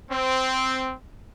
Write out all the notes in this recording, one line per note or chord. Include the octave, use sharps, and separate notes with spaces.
C4